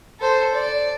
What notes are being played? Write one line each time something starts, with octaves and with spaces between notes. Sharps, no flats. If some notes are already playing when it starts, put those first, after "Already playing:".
A4 C5
D5